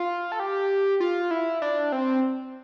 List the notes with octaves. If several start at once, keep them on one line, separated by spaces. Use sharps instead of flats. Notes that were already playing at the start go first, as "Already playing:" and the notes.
Already playing: F4
A4
G4
F4
E4
D4
C4